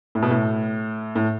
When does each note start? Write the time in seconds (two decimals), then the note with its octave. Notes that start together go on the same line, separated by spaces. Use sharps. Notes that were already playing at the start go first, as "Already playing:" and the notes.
0.15 A2
0.22 B2
0.30 A2
1.15 A2